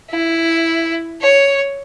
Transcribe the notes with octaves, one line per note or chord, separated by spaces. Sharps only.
E4
C#5